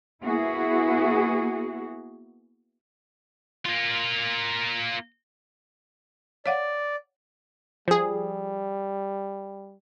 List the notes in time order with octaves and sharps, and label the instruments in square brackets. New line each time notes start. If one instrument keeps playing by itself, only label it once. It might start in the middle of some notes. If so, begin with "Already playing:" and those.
[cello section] A#3 B3 E4 F#4 G#4
[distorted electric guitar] A#3 F4
[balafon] C#5 F5 F#5 [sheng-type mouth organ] D5
[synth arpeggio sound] F3 G#4 [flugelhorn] G3